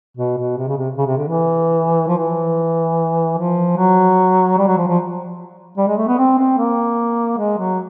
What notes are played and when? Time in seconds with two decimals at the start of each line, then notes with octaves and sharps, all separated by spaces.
0.17 B2
0.37 B2
0.57 C3
0.67 C#3
0.77 C3
0.97 C#3
1.06 C3
1.17 D3
1.27 E3
2.07 F3
2.17 E3
3.38 F3
3.77 F#3
4.58 G3
4.67 F#3
4.77 F3
4.87 F3
5.77 G3
5.88 G#3
5.97 A3
6.08 B3
6.18 C4
6.38 C4
6.57 A#3
7.38 G#3
7.58 F#3